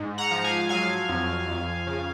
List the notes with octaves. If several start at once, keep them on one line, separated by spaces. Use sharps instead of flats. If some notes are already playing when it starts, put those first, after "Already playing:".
Already playing: G#2
F#5 A#5
F3
F5 G#5
F#3 F5 G#5
F2
F2
C#3